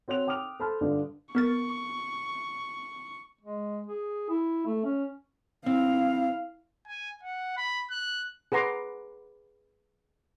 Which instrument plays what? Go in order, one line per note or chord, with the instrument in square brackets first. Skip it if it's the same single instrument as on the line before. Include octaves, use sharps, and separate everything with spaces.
[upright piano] C4 F#4 C#5 F#6 F7
G5 D6 D#6 F6 F7
A4 C5 A5 B5 F6
G2 D3 D4 F4
[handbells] B3 A#4 A6 [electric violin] C#6
[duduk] G#3
G#4
E4
A3
C#4
[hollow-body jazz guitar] C4 [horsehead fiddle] E4 F5
[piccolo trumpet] G#5
F#5
B5
F#6
[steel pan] G#4 B4 F#5 A#5 C6 D6